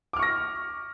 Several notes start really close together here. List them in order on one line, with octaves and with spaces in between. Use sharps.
D6 F6 C#6 A#6